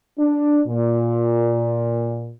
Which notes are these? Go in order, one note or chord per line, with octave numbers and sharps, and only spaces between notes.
D4
A#2